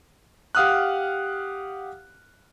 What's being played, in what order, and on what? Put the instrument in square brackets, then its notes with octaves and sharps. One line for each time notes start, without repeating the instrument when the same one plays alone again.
[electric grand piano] G4 F5 F#5 D#6 F6 F#6